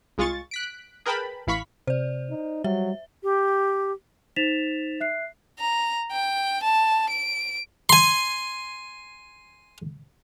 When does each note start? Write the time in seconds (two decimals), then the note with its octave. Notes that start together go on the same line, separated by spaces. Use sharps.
0.18 C2 G#3 F4 G#4 C#6 A6
0.51 F#6 B6 D7
1.06 G#4 A#4 B4 G5 A5 B5
1.47 A1 E3 F5 B5 C#6 B6
1.87 C3 C5 D5
2.30 D#4
2.64 F#3 G3 E5
3.23 G4
4.36 D#4 C5 A6 B6 E7 F7
5.00 E5 F#6 C7
5.60 A#5
6.12 G5
6.63 A5
7.10 D7
7.89 G#5 C6